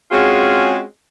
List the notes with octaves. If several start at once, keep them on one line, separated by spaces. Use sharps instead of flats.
G#3 C4 C#4 F4 F#4 G#4